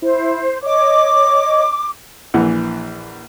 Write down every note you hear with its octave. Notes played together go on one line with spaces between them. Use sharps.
E4 C5
C#5 D#5 D6
A#1 E3 F#5